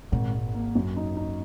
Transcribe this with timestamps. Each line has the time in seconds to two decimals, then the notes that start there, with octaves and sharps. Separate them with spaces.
0.12 G#1 A#2
0.33 G#1
0.54 A#3
0.75 F#2
0.97 D#4
1.17 D#4